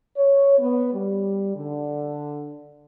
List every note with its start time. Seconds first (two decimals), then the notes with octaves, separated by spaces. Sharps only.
0.17 C#5
0.59 B3
0.93 G3
1.56 D3